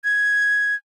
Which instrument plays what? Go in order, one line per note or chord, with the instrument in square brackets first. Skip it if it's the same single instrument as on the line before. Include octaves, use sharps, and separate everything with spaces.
[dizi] G#6